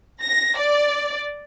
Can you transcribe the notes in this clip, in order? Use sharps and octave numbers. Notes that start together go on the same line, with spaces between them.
A#6
D5